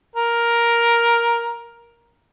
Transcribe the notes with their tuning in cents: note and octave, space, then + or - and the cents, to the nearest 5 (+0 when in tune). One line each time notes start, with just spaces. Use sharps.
A#4 +10